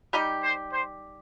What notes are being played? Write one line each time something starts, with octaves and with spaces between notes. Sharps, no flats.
G3 D#4 G4
C5
C5